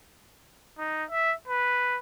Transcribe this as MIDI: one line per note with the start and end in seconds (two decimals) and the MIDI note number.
0.78 1.04 63
1.10 1.33 76
1.48 1.98 71